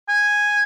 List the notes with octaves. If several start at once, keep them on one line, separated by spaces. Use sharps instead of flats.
G#5